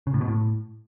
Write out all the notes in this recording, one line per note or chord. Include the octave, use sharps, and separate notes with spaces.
C#3
A2
B2
A2